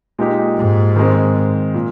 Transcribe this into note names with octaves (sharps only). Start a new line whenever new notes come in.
A#2 G#3 D#4 G4
G#2
D#3 G#3 C4
A#2